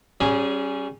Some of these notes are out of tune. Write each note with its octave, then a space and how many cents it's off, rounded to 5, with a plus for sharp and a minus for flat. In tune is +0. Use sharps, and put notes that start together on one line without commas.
G3 -30 C#4 -5 G#4 +0